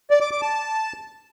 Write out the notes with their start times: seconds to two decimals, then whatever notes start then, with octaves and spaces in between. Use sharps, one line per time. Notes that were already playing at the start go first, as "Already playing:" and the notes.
0.11 D5
0.21 D6
0.31 D6
0.42 A5